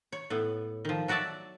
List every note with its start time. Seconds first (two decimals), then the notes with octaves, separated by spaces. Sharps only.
0.12 C#5
0.30 A2 B3
0.85 D#3 F3
1.08 F#3 F#4 D5 E5 A5